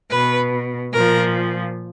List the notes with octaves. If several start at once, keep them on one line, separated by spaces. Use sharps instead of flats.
B2 B4
A#2 F3 A#4